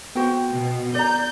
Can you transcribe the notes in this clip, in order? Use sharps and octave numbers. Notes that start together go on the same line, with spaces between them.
B3 F#4 C5 G5
B2
D5 A#5 G6